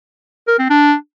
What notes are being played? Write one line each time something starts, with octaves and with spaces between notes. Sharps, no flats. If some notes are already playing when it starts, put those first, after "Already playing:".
A#4
C4
D4